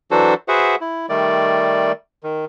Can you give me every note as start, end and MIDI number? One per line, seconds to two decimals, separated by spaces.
0.11 0.34 52
0.11 0.34 54
0.11 0.34 62
0.11 0.34 66
0.11 0.34 69
0.11 0.34 72
0.48 0.75 66
0.48 0.75 68
0.48 0.75 71
0.48 0.75 72
0.48 0.75 76
0.48 0.75 78
0.81 1.06 64
1.09 1.92 51
1.09 1.92 55
1.09 1.92 57
1.09 1.92 74
2.23 2.45 51